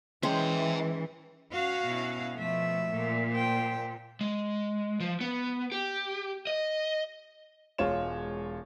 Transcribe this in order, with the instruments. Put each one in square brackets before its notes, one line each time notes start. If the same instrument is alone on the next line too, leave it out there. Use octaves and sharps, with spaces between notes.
[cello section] E3 [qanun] G#3 C#4 C5 [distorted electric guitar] E5 G5
[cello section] C#4 F#4 F5
[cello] B2 E4
[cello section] B2 A3 [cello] F3 E5
[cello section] A#2
[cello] C5 G5
[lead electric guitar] G#3
F3
B3
G4
D#5
[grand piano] E1 G#3 F4 C#5 E7